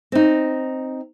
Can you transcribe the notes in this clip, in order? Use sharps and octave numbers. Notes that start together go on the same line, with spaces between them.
C4 D#4